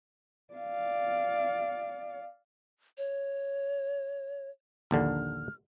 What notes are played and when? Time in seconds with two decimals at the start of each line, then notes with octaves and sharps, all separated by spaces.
0.54 D5 F5
2.98 C#5
4.91 A#1 D#2 D3 F6